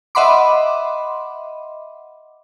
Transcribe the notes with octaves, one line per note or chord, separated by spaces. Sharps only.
D#5 E5 F#5 B5 C6 D6